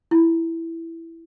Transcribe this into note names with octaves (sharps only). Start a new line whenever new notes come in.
E4